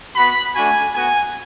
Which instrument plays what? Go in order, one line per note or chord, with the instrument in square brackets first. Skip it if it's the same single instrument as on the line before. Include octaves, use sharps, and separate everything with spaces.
[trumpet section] B3 F#4 B5
A3 D4 F#4 G#5
B3 F#4 G#5